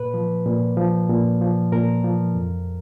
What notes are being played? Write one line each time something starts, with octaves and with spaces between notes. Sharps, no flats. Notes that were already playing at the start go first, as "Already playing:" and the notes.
Already playing: A#2 B4
F3
A#2
F3
A#2
F3
A#2 A#4
F3
F2